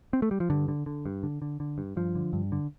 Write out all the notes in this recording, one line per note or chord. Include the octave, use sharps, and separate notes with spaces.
C4
A3
G3
F3
G2 D3
D3
D3
G2
D3
D3
D3
G2
G2 F3
D3
G2
D3